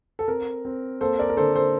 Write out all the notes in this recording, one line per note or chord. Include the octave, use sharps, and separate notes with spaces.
A4
C4 A#4
C4
A#3 A4 C5
A#4 D5
A#4
D3 A4 C5
A4 C5